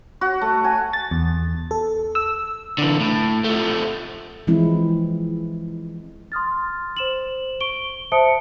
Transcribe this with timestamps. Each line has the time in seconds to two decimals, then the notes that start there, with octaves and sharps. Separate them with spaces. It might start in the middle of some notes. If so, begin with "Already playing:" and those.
0.21 F#4
0.41 A3
0.64 G#5
0.93 A6
1.11 E2
1.71 A4
2.15 E6
2.78 D3 E3
3.00 A2
3.44 F3 A3
4.47 E3 F3 G#3 C4 E4
6.32 C6 D#6 F6 A6
6.97 C5 E7 F#7
7.60 C#6 D7 G7
8.12 C5 E5 A5 D#6 C#7 D7